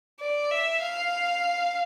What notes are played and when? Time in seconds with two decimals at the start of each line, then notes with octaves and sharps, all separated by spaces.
0.20 D5
0.51 E5
0.81 F5